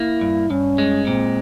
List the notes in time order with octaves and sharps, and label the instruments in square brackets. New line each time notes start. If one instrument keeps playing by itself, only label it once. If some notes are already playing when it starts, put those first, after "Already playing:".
Already playing: [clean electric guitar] A#3 [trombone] E4
[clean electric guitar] G2
[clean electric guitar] G2 [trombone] C#4
[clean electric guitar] G#3
[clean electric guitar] A#2 [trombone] C4